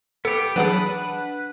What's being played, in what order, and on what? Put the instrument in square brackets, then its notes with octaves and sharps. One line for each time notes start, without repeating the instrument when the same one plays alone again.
[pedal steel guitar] B3 G4 [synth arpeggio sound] A4 C#7
[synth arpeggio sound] E3 F#3 G#4 [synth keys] D4 F#5 A5 [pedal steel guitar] B4